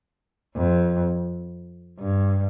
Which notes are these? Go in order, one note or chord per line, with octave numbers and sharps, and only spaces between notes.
F2
G2